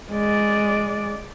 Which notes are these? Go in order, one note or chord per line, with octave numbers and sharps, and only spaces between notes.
G#3 D5